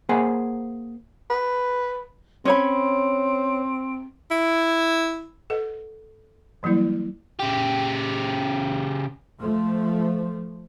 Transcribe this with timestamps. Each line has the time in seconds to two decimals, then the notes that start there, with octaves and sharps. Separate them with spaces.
0.09 A#3 G#4 C5 F#5 G#5
1.30 B4
2.45 C4 C#4 C#5 B5
4.31 E4
5.50 A4 B4 D#5 F#5
6.63 E3 F#3 G3 A#3 E4
7.39 C#3 G4
9.41 F3 A3